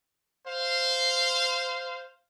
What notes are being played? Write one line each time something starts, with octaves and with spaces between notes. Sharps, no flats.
C5 F5